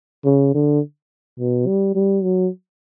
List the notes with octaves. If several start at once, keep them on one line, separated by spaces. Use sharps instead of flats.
C#3
D3
B2
G3
G3
F#3